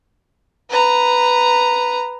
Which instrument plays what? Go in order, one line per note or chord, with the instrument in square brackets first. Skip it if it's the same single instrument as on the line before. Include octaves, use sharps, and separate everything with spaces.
[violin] B4 A#5